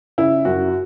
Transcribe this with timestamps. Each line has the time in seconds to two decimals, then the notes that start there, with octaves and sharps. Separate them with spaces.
0.18 C#3 E4
0.45 F#2 F#4